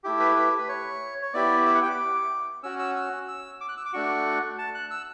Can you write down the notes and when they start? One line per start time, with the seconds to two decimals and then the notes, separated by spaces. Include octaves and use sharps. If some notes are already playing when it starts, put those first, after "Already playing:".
0.04 A3 E4 G4
0.20 B4
0.36 B4
0.58 B4
0.69 C#5
1.22 C#5
1.34 B3 E4 G4 D5
1.66 E5
1.75 F#5
1.83 G5
1.91 D6
2.63 C#4 F#4 E6
2.79 E6
2.96 E6
3.28 E6
3.61 D6
3.69 F#6
3.77 E6
3.86 D6
3.93 A3 D4 F#4 C#6
4.59 A5
4.75 F#6
4.91 E6